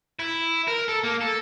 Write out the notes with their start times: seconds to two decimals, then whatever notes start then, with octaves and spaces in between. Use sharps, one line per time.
0.20 E4
0.68 A#4
0.89 A4
1.04 A#3
1.21 A4